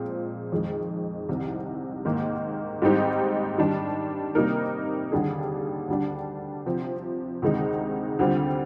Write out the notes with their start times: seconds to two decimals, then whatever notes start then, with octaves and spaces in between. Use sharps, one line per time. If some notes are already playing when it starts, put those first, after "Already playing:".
Already playing: A#2 F3 G#3 C4
0.52 F2 D#3 G#3
1.29 C2 C3 D#3
2.05 G#2 D#3 A#3
2.82 G#2 G3 C4 D#4 G4
3.58 D#3 G3 D4
4.35 C3 G3 A#3 D#4 A#4
5.12 D#2 D3 G3 D4 G#4
5.88 D2 D3 G3 D4
6.66 C3 F3 C4
7.42 D2 C3 D#3 G#3 D#4
8.19 D2 D3 G3 C4 F4